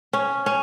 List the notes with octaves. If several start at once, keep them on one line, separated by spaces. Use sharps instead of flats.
C#4
C#4